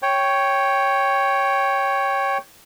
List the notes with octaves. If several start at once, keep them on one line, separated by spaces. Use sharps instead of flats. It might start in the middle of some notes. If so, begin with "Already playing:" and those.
C#5 G5